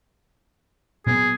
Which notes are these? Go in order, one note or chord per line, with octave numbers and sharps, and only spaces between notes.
A#2 F#3 B3 G#4